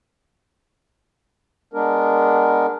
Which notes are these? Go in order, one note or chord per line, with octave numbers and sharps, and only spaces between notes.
G#3 B3 D4 A#4